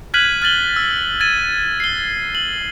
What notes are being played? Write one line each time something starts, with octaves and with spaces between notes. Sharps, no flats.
F6 F#6 G#6 B6 D#7 F#7
F6 G#6 A6 F#7 G7
E6
G#6 A6 D#7
C7 G7
F#7